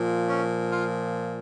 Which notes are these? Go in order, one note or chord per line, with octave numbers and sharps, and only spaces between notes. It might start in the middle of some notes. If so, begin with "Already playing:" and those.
Already playing: A#2 F3
C#4
F4